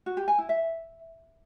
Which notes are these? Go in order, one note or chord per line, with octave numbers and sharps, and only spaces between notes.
F#4
G4
G#5
E4
E5